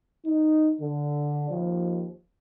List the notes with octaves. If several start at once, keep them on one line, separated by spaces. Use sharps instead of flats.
D#4
D3
D#2 F3